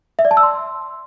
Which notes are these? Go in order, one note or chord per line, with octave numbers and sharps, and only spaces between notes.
E5
D5
A5
E6
C6